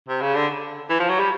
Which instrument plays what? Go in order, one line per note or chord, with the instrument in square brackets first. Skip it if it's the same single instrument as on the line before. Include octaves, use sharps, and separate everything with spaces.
[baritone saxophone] C3
C#3
D3
E3
F3
F#3
G3